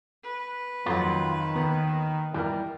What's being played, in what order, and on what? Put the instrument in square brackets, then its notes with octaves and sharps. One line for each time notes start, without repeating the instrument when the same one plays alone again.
[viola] B4
[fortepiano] F2 F#3 [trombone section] D#3 [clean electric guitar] F4
[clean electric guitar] D#2 [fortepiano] B3
[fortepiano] E2 A#4 [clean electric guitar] G3